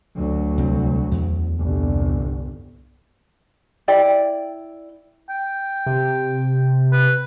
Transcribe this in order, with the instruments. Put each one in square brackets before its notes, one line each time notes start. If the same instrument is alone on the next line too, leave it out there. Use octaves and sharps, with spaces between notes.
[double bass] D2 F#3
[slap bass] C2 C4
E2
[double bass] G1 C2
[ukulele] E4 D5 G5
[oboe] G5
[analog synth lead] C3
[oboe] B4